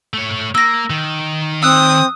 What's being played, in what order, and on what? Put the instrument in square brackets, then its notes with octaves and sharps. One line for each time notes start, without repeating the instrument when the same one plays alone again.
[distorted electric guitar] A3 C#5
[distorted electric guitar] A#3 [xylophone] E6 A#6
[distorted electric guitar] D#3
[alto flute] C4 [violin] D#6 [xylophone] E6 F#6